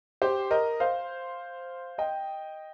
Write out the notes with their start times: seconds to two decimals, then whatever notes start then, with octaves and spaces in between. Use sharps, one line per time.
0.22 G4 C5
0.51 A#4 D#5
0.80 C5 F5
1.98 D#5 G5